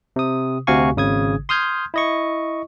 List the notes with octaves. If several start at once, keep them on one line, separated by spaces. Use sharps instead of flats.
C3 D#6
D2 C3 F#4 F5 G#5 C#6
G#1 C#3 D#6 G#6
C6 D#6 F6 G6 G#6
E4 D#5 C#6